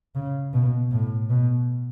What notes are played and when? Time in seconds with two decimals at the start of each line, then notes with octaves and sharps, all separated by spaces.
0.15 C#3
0.53 B2
0.91 A2
1.30 B2